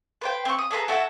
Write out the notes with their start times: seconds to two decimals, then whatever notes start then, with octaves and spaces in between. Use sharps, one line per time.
0.21 B4 C5 G5
0.45 C4 C#6
0.58 D#6
0.71 G#4 A4 B4 A#5
0.88 E4 F#4 A4 E5